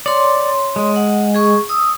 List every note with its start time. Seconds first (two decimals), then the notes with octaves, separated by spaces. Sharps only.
0.06 C#5 D5 C6
0.76 G#3
0.96 F#5
1.35 G#4 C#6
1.69 D#6 E6